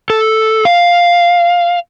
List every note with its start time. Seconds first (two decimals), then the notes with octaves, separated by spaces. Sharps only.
0.10 A4
0.65 F5